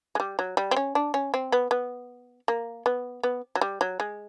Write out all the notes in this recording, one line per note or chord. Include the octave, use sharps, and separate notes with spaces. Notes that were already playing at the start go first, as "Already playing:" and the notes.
G#3
G3
F#3
G3
C4
C#4
D4
C#4
C4
B3
B3
A#3
B3
B3
F#3
G3
F#3
G#3